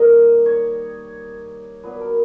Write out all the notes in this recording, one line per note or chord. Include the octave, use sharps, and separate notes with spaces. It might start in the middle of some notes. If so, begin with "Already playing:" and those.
Already playing: D#3 G3 A#3 D#5
C#5
A#2 F#3 B3 B4
A#4